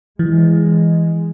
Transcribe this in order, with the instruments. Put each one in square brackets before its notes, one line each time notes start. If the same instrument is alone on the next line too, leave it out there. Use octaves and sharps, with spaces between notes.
[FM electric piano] E3 [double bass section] G#3